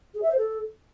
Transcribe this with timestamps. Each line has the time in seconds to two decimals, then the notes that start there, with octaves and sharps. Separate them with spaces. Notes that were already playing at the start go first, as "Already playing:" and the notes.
0.14 G#4
0.22 E5
0.30 C5
0.38 A4